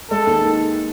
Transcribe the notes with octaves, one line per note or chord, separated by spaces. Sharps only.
G#3 A4
D#2
D#3